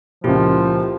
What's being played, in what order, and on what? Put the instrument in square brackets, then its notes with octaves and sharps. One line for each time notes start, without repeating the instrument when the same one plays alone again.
[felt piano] C#2 A#2 [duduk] F3 [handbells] E4 F4 G4